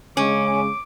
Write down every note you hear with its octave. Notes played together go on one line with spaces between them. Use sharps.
C#3 G#3 C#4 D6